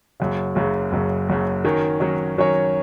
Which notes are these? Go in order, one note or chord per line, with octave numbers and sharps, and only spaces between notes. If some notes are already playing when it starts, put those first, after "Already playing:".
F#1 F#2 C#3
F#1 F#2 C#3
F#1 F#2 C#3
F#1 F#2 C#3
D#3 F#3 C#4 A#4 C#5
D#3 F#3 C#4 A#4 C#5
D#3 F#3 C#4 A#4 C#5